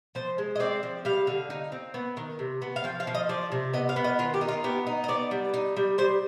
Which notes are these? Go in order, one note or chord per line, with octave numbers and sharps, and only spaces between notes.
F3 C5
G#3
D#5
C4 D5
F3
G3 F5
D3
D#4
C4
B3
D#3
C3
B3
F5
F3 G5
F5
F3
D#5
F3 D5
C3
B3 D#5
F5
B3
D#5
D#3 F4
G4
D#4
F4
B3 G4
D#4
D#5
B3 D5
G3
D#4
G3
G3 C5